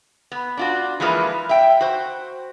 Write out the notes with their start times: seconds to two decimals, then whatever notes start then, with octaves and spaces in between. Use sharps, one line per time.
0.32 B3
0.57 D4 F4 F#4
1.00 E3 F3 G#3 A#3 F4 B4
1.49 E5 G5
1.81 F#4 C5